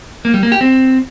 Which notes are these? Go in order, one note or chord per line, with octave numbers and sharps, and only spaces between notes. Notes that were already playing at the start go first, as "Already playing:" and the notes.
A#3
G3
A#3
G4
C4